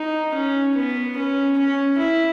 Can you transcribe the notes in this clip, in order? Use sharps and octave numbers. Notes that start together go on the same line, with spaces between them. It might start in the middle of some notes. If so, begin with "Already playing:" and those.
Already playing: D#4
C#4
B3
C#4
C#4
E4